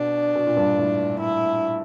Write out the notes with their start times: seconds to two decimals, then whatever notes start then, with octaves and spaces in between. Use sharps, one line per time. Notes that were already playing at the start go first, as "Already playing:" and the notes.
Already playing: B2 D4
0.35 B2
0.47 A#2
0.57 G2
0.78 A2
1.21 E4